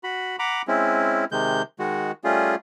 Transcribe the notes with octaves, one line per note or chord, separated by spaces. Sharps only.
F#4 B5
F#5 A#5 B5 D6
G#3 C4 C#4 E4
C3 D#3 G#3 G6
D#3 G#3 F#4
G3 A3 C#4 F4 G#4